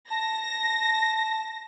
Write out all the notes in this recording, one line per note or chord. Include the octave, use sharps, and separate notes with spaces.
A5 A#6